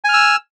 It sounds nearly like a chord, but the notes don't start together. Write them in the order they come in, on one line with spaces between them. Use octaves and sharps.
G#5 F6 E6